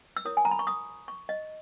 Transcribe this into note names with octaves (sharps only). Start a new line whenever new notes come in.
E6
E4 A#4 C#5 D#6
G#5
A#5
B5
C#6
D#6
C#6
D#5